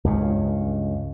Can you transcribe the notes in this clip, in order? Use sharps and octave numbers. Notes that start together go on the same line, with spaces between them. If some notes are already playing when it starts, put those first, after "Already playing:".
C#2 G2 C#3